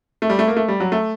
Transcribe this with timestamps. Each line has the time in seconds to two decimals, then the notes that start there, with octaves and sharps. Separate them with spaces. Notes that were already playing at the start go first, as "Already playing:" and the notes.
0.22 A3
0.30 G3
0.39 A3
0.48 A#3
0.56 A3
0.68 G3
0.80 F#3
0.92 A3